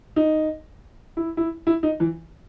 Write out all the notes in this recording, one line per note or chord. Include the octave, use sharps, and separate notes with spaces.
D#4
E4
E4
E4
D#4
E3